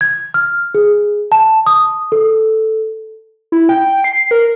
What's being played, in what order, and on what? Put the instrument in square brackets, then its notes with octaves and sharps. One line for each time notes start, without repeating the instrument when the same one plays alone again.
[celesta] G#6
F6
G#4
A5
D#6
A4
[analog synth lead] E4
G5
C7
A#4